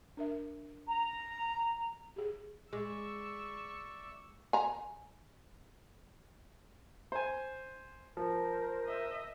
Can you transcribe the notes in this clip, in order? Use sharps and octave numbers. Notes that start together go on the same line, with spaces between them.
D4 A#4 E5
A#5
G4 G#4
G#3 D5 E5 C#6 E6
G#5 A#5
C5 G#5
F3 A#4 C5
D#5 E5